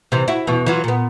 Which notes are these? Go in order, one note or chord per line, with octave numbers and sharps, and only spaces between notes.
C3 E3
E4 F#4
E2 B2 E3
E3 F#3 F4
A#2 B3